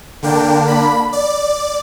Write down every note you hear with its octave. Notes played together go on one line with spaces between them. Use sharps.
D3 A#3 D4 G5
B5
D5